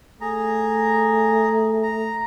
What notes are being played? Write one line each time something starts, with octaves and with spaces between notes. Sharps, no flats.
A3 G#4 A#5
A#5